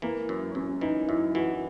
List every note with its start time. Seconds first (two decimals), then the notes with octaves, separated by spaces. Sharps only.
0.02 E3 A#3
0.29 F#2
0.55 F#2 C#4
0.81 E3 D#4
1.08 F#2 E4
1.35 E3 F#4